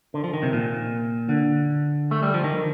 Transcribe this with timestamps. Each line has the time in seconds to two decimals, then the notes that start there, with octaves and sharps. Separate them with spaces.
0.14 D3
0.24 F3
0.34 D#3
0.43 C3
0.53 A#2
1.29 D3
2.11 A3
2.23 G3
2.34 F3
2.44 D#3